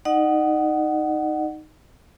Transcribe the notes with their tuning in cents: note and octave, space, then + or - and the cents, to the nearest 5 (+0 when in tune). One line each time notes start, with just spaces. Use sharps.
D#4 +0 D#5 -45 F#5 +10